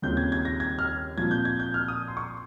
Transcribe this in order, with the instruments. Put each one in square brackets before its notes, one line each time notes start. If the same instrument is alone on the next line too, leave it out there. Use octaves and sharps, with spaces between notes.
[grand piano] D#2 C#3 G3 C4 F4 G6
G#6
G#6
A#6
G#6
F6
A#2 F3 C4 F4 G#6
G6
G#6
G6
F6
D#6
C6
C#6